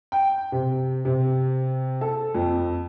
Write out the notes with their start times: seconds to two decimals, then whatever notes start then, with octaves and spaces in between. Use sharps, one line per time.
0.12 G5
0.52 C3
1.05 C3
2.01 A4
2.35 F2